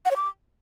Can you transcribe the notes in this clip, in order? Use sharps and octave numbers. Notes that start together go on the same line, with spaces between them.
F#5
C#5
D6